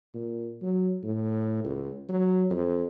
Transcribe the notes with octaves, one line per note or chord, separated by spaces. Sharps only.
A#2
F#3
A2
C#2
F#3
F2